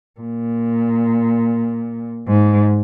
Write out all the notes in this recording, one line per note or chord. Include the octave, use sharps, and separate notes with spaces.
A#2
G#2